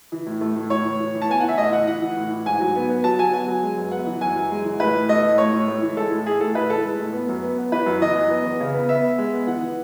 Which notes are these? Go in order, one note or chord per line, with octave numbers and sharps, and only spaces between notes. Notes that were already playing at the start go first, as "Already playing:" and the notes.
E3
A2
A3
A2
A2 C#5
E3
A2
E3
A5
B3 G#5
E3 F#5
E5
A2 D#5
E3 F#5
E3 F#5
E3
A2
E3
G#2 G#5
F#3
B3
B3
F#3 A5
F#3 G#5
B3 G#5
F#3
G#3
F#2
B3 F#5
E3
F#2 G#5
F#2
G#3
E3
A2 B4
A2
A3 D#5
A2
A3 C#5
A2
A3
E3
G#3 A4
A2
A2 G#4
A2 A4
A2 B4
E3 A4
G#3
A2
B3
F#2
B3
B3
E3 B4
F#2
E3 D#5
F#2
B3
E2
C#3
B3
B3 E5
B3
G#3
B3
E3 F#5
E3